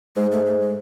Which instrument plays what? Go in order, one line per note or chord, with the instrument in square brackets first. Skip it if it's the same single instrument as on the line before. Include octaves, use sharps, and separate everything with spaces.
[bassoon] G#2 [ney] G#3
[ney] A3
A3
G#3